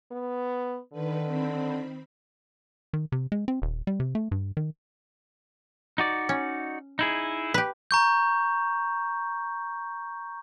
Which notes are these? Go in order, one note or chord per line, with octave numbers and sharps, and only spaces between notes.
B3
D3 D#3 B4
D#3 C4 B5
D#3
C3
G#3
C4
D#1
G3
C3
A3
G2
D#3
D#4 F#4 D5
C#4
D#4 E4 G#4
G4 B4
A#5 C#6 G6